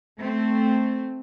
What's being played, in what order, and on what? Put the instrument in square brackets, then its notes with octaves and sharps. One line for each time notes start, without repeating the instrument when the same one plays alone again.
[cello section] A3 C4